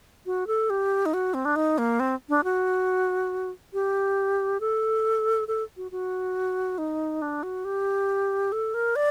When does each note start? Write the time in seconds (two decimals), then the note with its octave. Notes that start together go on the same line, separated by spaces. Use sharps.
0.26 F#4
0.47 A4
0.70 G4
1.06 D#4
1.14 F#4
1.34 C4
1.45 D4
1.56 D#4
1.78 A#3
2.00 C4
2.29 D4
2.44 F#4
3.73 G4
4.61 A4
5.48 A4
5.77 F#4
5.91 F#4
6.78 D#4
7.22 D4
7.43 F#4
7.65 G4
8.52 A4
8.74 A#4
8.96 D5